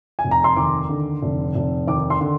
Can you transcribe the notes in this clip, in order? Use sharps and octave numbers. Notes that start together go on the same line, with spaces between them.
G#5
F1
A#5
C6
D#2 D6
D3
F1
F1
D#2 D6
C6
D3